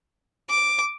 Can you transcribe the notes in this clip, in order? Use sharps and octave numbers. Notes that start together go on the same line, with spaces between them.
D6